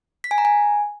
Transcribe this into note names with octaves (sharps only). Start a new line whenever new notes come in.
B6
G#5
A#5
G#5